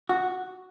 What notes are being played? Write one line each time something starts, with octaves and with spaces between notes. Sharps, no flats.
F#4